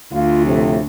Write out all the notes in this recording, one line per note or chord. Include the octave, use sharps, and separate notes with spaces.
D2 F4
A2 C3 F3